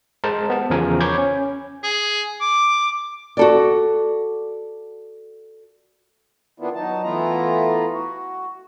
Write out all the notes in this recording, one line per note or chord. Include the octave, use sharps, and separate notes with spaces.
G#3 A#4 C5 A5 A#5
B3 A5
E2 C#3 F3 A#4 G#5
C#5 B5 C#6 D6 G6 G#6
C#4
G#4
D6
F#4 A4 D5
D#3 A#3 B3 D4 E4 F4
F#3 D#4 A5
E3 A3 B3 E4 F4 A#5
F#4